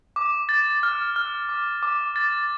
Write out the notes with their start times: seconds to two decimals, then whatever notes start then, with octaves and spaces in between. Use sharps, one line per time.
0.16 D6
0.49 A6
0.83 F6
1.16 F6
1.49 D6
1.83 D6
2.16 A6